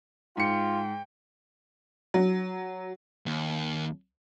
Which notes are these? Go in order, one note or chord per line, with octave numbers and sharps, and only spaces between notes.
G#2 F4 G5 C#7
F#3
D#2